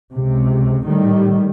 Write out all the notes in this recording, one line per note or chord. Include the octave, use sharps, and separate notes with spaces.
C#2 C3
A2 D#3 G3